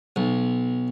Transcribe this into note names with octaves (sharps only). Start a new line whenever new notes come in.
B1